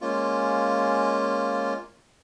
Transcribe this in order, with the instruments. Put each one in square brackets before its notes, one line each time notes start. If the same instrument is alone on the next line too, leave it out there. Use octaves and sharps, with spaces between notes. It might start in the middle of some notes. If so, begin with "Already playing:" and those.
[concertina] G#3 A#3 C#4 F4